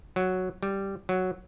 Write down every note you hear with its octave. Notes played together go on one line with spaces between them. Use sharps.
F#3
G3
F#3